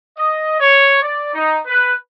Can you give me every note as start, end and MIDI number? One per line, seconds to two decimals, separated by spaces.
0.18 0.57 75
0.60 0.98 73
1.03 1.32 74
1.34 1.59 63
1.67 1.93 71